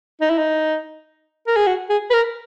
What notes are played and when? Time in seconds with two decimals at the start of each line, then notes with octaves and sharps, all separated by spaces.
0.21 D#4
0.30 E4
0.38 D#4
1.47 A#4
1.56 G#4
1.67 F#4
1.90 G#4
2.10 B4
2.14 A#4